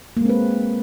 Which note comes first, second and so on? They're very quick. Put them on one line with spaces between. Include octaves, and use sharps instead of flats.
A#3 G#3 C4 B4